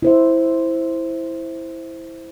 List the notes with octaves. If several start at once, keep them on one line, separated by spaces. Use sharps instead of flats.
E4 C5 E5